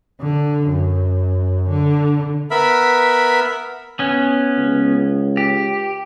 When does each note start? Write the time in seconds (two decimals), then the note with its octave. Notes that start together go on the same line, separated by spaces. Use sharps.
0.20 D3
0.68 F#2
1.69 D3
2.51 B3 A#4 E5 B5
3.99 B3 C#4
4.58 C#2
5.37 G4